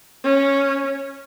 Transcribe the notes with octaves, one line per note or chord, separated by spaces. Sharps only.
C#4